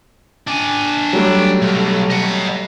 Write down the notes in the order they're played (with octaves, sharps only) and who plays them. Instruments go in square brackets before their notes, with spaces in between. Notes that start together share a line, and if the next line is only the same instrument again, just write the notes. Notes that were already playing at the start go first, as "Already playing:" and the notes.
[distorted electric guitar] D4 G#5
[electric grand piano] F#3 G3 A3
[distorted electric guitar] B1
D#5 F#5